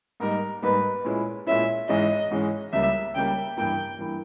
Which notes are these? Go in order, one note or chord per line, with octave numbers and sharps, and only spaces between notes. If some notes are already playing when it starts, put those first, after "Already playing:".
G#2 G3 A#3 D#4 A#4
G#2 G3 A#3 D#4 B4
A#2 G#3 C#4 E4
A#2 G#3 C#4 E4 E5
G#2 E3 G#3 C#4 D#5
G#2 E3 G#3 C#4
C#2 C#3 G3 A#3 E5
C#2 C#3 G3 A#3 G5
G2 E3 A#3 E4 G5
G2 E3 A#3 E4